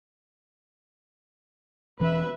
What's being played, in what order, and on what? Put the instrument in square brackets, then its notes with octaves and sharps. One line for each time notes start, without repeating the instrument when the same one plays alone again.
[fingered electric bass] E1 E3 C#4 [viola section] B4 E5